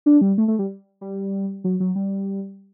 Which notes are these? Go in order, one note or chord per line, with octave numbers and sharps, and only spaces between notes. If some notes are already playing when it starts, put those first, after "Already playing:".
D4
G3
A3
A3
G3
G3
F#3
F#3
G3